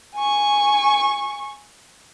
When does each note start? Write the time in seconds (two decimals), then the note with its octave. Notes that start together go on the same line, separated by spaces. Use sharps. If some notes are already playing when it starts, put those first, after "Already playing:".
0.15 G#5 C#6